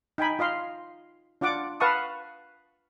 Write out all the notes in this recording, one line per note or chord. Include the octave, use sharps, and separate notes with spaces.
D#4 G5 G#5 B5
F4 D#5 F5 C6
D4 F4 D5 F#5 D6
B4 F5 F#5 A5 C#6 D#6